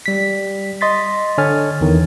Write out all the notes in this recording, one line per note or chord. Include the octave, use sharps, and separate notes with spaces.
G3 B6
D#5 C6 A6 B6
D3 C#5 G#5 F6 A6
E2 D#3 E3